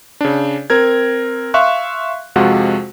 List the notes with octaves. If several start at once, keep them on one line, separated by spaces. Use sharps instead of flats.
C#3 D4
C4 A#4 G#6
E5 F5 C6 C#6 F#6
F2 C3 G#3 F4 F#4 F#5